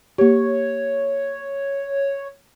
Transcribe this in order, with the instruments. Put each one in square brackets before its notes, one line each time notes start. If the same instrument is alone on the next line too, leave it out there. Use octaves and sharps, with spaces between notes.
[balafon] A#3 G4 [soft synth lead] C#5